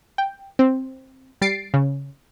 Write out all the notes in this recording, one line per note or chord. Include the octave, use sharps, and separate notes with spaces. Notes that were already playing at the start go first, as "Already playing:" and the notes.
G5
C4
G3 A6 C7 D7
C#3